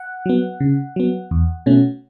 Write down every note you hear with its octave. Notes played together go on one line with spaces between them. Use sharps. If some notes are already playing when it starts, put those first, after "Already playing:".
Already playing: F#5
F#3 B3
C#3
F#3 B3
E2
B2 A3 C#4